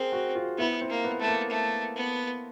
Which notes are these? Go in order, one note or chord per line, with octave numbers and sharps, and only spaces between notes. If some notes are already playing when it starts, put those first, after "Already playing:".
Already playing: C4 G#4 A#4
F#4
F4
B3 E4
C4
A#3
B3
A3
A#3
A3
B3